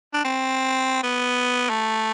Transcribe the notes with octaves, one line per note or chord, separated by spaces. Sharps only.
D4
C4
B3
A3